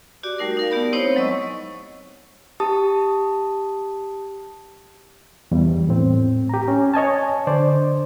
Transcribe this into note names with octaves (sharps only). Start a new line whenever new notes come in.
F#4 G4 D5 D6
G3 A3 D#4 A#4
D#4 A#4 F5
B3 G4 D5 B5
C4 D#4 E4 C5 C#5
F#3 G#3 D#5 C#6 E6
G4 A5 D#6
E2 G3
A2 C4
G4 A#5
C#4
C#5 D#5 G#5 A5
D3 C5 D5